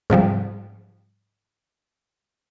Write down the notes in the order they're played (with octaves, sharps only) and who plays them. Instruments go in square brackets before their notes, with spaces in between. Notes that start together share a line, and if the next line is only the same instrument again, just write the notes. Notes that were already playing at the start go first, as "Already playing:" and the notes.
[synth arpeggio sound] G#2 C3 F3 G3